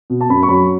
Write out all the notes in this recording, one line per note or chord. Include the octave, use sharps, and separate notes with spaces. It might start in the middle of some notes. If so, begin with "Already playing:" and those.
B2
A5
F#2 B5
C#6
F#3 B5